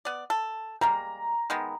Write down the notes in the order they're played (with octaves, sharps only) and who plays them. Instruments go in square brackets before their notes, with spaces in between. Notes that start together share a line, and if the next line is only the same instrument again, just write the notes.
[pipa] B3 D5
A4
[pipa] G3 G#3 A#3 [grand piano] A#5
[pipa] D#3 G#3 B3